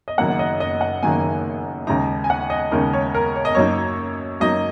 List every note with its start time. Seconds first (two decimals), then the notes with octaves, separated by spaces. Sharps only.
0.08 D#5
0.18 F#1 F#2 D#3 A#3 F#5
0.39 D#5
0.60 D#5
0.81 F#5
1.02 F#1 F#2 D#3 A#3 G#5
1.87 D#2 C#3 G#3 D#4 A#5
2.24 G#5
2.30 F#5
2.50 D#5
2.71 D#2 C#3 G#3 D#4 A#4
2.93 C#5
3.14 A#4
3.36 C#5
3.45 D#5
3.55 F#2 F#3 A#3 D#4 C#5
4.40 F#2 F#3 A#3 D#4 D#5